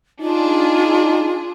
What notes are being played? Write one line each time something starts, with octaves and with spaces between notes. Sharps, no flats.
D4 D#4 F4 G#4